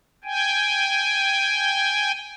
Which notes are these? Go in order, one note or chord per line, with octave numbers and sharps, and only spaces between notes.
G5 G#5